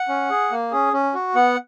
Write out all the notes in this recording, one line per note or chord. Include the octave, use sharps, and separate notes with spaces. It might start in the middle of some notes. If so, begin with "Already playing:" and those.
Already playing: F#5
C#4
G#4
A#3
C#4 G#4
C#4
F#4
B3 F#5